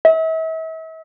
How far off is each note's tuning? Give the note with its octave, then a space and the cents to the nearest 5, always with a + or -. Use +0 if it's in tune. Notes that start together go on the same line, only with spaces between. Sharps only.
E5 -40